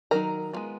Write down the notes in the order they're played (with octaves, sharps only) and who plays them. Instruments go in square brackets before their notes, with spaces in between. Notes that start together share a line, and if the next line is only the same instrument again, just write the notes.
[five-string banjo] D#3 F#3 D#4 A#4 A#5
G#3 B3 F4